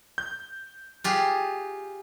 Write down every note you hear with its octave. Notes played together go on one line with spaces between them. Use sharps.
G6
F4 G4 G#4